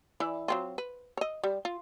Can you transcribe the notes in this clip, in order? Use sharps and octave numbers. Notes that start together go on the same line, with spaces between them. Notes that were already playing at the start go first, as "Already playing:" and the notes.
E3 E4 D5
F#3 C4 F4
B4
C#5 D#5
G3
F4